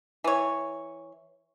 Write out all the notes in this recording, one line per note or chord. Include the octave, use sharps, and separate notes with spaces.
E3 C#5